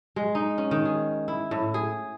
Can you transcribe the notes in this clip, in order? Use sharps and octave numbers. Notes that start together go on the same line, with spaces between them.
G#3
D#4
C#4
D#3
G#4
E4
A2
G#4